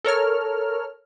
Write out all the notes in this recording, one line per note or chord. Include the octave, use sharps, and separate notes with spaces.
A4 A#4 C#5 F6